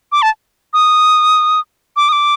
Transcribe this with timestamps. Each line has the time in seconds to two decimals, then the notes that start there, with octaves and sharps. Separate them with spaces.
0.12 D6
0.22 A5
0.73 D#6
1.97 D6
2.09 D#6
2.12 D6